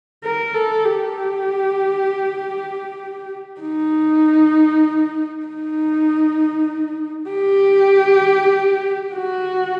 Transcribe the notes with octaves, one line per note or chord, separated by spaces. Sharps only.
A#4
A4
G4
D#4
D#4
G4
F#4